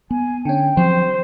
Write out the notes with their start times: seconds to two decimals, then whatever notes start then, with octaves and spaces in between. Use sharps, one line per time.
0.11 B3 G#5
0.45 D3 C#4 G5
0.77 F3 F#3 C4 C5